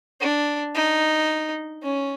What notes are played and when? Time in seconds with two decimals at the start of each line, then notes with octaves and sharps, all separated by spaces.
0.20 D4
0.75 D#4
1.83 C#4